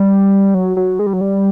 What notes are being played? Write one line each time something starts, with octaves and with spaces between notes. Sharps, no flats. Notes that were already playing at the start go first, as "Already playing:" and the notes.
Already playing: G3
F#3
F#3
G#3
G3
F#3
G3